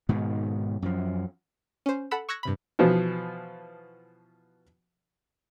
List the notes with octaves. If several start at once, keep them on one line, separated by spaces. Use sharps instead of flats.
G#2 B2 D#3
F#2 F3
C#4 C5
A4 F#5 B5 E6
C#6 E6 F#6 G#6 A#6 C#7
G2 C3 B5
B2 E3 F3 B3